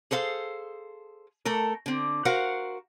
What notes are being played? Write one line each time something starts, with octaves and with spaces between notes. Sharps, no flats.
G#4 A4 C5 F5
A3 A4 A#4
D3 C4
F#4 A#4 C5 F5 F#5